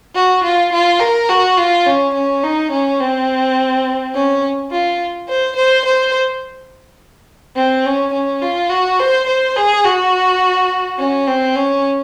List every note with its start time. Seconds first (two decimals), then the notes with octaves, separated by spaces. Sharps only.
0.15 F#4
0.44 F4
0.72 F4
1.00 A#4
1.29 F#4
1.57 F4
1.86 C#4
2.14 C#4
2.43 D#4
2.72 C#4
3.00 C4
4.15 C#4
4.71 F4
5.29 C5
5.56 C5
5.85 C5
7.56 C4
7.85 C#4
8.13 C#4
8.42 F4
8.70 F#4
8.99 C5
9.27 C5
9.56 G#4
9.84 F#4
10.99 C#4
11.27 C4
11.55 C#4